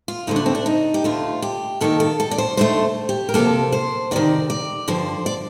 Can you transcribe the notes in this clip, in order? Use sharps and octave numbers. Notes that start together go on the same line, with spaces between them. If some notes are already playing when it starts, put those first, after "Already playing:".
F4
D2 D3 A3 D#4
D4
C4
D4
D#4
G4
D2 D3 A3 F4
G4
G2 D#3 A#3 A4
A4
A4
D5
C5
D#2 D3 A3 C5
G4
A#4
D2 C3 F3 A#3 A4
C5
D2 C3 D#3 D5
D5
G2 D3 F3 C5
D5